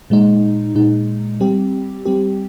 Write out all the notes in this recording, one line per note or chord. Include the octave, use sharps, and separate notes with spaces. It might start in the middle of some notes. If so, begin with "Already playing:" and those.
A#2 G#3 D#4
A#2 G#3 D#4
G3 C4 G4
G3 C4 G4